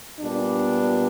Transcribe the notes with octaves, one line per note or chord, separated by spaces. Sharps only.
A#2 G3 B3 D4